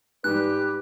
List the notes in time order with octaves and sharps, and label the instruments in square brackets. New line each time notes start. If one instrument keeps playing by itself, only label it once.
[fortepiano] G#2 G3 [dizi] G4 [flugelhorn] B4 [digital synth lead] F#6